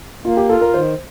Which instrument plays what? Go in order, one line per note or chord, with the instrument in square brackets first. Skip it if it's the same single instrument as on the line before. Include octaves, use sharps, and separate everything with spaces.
[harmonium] A#3 [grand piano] F4
[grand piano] G4
[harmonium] F4 [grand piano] A4
[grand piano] A#4
[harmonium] D#3 [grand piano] C5